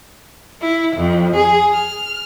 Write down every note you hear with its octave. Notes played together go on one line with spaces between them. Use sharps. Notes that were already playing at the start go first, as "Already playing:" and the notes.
E4
F2
G#4
F6